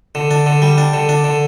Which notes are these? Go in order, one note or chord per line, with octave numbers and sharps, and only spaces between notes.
D3
D4
D3
G3
D4
D3
D4
D3